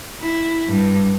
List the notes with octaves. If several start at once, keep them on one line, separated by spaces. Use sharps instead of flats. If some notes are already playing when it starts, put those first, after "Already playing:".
E4
G2